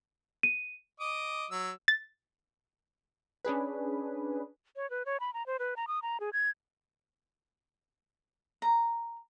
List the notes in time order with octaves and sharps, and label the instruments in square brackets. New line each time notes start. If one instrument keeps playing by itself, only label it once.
[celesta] D#7
[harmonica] D#5 D6 D#6
F#3 E6
[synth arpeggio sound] A6
[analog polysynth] C#4 D4 G#4 B4
[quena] C#5
B4
C#5
B5
A#5
C5
B4
A#5
D#6
A#5
G#4
G#6
[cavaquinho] A#5